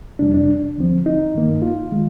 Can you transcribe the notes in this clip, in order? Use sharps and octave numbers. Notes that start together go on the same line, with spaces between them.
F2 C3 G3 D4
D4
D#2 D3 F3 C4
D#4
G2 D#3 A#3
F4
D#3 G#3